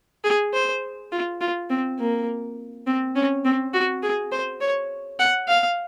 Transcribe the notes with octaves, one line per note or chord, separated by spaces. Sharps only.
G#4
C5
F4
F4
C4
A#3
C4
C#4
C4
F#4
G#4
C5
C#5
F#5
F5